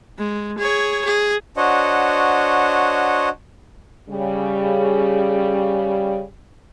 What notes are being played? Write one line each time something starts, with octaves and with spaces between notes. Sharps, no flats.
G#3
G#4 C#5
G#4
D4 F#4 C5 C#5 D#5 F#5
C#3 G3